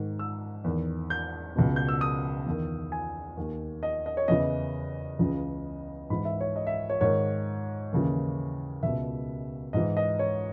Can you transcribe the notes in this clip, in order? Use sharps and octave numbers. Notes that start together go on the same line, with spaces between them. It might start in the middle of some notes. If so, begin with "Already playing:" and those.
Already playing: G#2 D#3
E6
E2 D#3
G6
C#2 B2
G6
E6
D#6
E2 D#3
G#5
D#2 D#3
D#5
D#5
C#5
E2 C#3 E3 D#5
C#2 C#3 E3
G#2 E3 B5
E5
C#5
D#5
E5
C#5
G#2 D#3 C#5
D#2 C#3 E3
C#2 B2 E5
G#2 E3 D#5
D#5
C#5